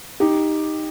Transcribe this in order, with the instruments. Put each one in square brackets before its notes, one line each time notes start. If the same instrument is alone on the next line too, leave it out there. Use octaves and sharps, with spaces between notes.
[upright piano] D#4 G4